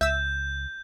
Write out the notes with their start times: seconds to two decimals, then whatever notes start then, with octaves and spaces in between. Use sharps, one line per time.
0.01 C#2 E5 E6 G6